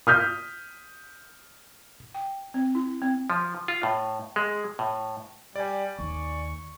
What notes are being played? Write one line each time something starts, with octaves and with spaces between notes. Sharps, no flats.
D#6 F6 G6 B6
G5
C4
E4
C4
F3
F4
A2
G#3
A2
G3 D5 G#5
D#2 C#6